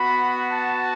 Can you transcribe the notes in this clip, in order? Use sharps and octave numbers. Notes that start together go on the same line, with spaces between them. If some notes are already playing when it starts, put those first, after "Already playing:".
Already playing: B3 F#4 B5
A5